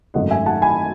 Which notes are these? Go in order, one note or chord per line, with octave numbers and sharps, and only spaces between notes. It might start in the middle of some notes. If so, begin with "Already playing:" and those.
G#1 F#2 D#3 A3 D#5 F#5
E5 G#5
F#5 A5
G#5 B5